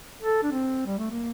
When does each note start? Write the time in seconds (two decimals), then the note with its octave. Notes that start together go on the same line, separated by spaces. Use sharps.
0.22 A4
0.43 D4
0.51 C4
0.86 G3
0.98 A3
1.10 A#3